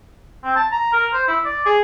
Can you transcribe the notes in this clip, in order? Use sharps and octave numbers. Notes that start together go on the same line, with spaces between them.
C4
A5
A#5
A#4
C5
E4
D5
G#4